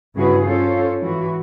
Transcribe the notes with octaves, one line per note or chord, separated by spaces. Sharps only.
G2 C#3 E4 F#4 G#4 B4
C#4 F4 A4 C5 C#5
G#2 E3 F#4